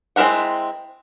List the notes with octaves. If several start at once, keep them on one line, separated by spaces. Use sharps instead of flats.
G#3 C4 E4 A#4 F#5